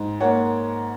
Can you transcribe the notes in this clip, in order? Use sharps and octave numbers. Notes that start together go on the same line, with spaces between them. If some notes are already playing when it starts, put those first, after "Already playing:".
Already playing: G#2
A#3 C#5 F#5